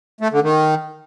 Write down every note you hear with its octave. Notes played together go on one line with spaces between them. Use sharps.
A3
D3
D#3